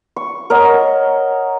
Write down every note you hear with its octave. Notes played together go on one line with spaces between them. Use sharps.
C#6
A#4 C#5 D#5 F#5